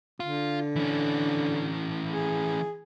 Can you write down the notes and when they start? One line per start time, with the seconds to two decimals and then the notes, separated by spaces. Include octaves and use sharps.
0.20 D3 F4
0.76 E3 C#4
2.09 G#4